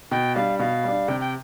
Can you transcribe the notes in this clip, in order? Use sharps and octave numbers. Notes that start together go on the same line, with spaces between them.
B2 G5
G3 D4 F5
B2 F5
G3 D4
C3 G5
G5